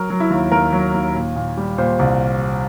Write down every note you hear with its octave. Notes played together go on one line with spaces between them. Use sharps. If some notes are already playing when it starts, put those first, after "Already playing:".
Already playing: F#3 A#4
F#3
E4
D#2
D#2 A#4
F#3
D#2
A#2
A#2
G3
A#2 C5
C2